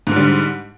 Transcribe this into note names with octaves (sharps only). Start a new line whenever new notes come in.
G#2 D3 G3